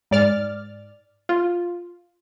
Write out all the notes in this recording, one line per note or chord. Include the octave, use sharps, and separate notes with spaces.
G#2 D5 F6 A6
F4